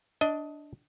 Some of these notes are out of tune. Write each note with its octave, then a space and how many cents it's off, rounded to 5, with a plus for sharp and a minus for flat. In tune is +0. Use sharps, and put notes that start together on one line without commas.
D4 +0 D#5 +20